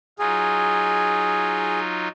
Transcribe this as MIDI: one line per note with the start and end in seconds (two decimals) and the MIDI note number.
0.19 2.08 54
0.19 2.08 63
0.19 2.08 65
0.19 1.79 68